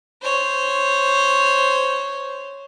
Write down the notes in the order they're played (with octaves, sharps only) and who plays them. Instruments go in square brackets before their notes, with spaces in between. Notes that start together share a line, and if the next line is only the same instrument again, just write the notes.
[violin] C5 C#5